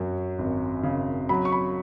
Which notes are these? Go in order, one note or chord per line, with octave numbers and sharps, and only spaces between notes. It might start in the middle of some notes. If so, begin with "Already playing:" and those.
Already playing: F#2 F#3
G#1
C#3
F#3 B5
C#6
B5